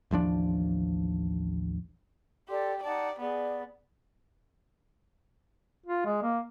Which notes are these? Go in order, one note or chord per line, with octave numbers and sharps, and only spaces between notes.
A1 D#2 F3 D4
G4 A4 D5 C6
D#4 D5 F#5 A5
B3 G#4 D5
F4
G#3
A#3